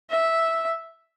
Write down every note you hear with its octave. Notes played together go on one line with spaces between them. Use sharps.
E5